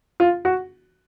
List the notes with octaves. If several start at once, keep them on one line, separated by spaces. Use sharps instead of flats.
F4
F#4